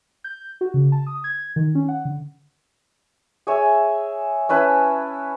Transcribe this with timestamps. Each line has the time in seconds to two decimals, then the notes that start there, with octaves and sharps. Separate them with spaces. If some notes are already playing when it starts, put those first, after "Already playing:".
0.24 G6
0.61 F#4
0.74 C#3
0.92 A5
1.07 D#6
1.24 G#6
1.56 D#3
1.75 C#4
1.88 F#5
2.05 D3
3.47 G#4 C#5 E5
4.49 C#4 E4 B4 A5